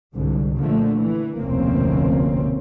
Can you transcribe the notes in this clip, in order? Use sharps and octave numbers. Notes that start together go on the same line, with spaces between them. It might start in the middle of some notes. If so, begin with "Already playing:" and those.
C2 G#2 D3
A#2 D3 F3 A3
E3
F1 D2 B2 A#3 C4 C#4